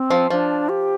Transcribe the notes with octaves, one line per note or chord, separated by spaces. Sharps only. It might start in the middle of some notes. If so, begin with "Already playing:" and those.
Already playing: C4
F3
F3 D4
G4